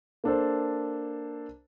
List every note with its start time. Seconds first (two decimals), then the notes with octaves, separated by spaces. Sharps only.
0.24 A#3 D4 A4 C5